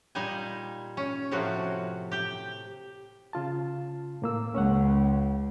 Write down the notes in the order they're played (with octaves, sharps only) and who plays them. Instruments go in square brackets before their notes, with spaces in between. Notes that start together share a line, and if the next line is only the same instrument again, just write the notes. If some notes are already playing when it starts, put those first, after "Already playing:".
[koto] A#2 G3 D#4 G#5
C#4
A2 C3 F3 F#4
G4 G5
[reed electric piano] C#3 F4 A5
A2 A#3 E6
[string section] C#2 [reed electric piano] C#4 C#5 F#5